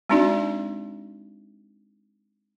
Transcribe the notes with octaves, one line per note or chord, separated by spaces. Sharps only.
G#3 C4 D4 D#4 F#4 D5